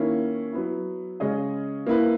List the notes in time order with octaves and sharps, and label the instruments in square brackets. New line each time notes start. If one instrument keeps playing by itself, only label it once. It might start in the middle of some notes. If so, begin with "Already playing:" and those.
Already playing: [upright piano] D#3 A#3 C#4 E4
F#3 B3 E4
C#3 G#3 C#4 G#4 D#5
A#3 E4 B4